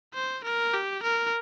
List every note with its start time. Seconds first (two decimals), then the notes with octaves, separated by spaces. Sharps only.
0.14 C5
0.44 A#4
0.74 G4
1.03 A#4